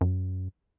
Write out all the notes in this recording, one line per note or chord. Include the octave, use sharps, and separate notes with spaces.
F#2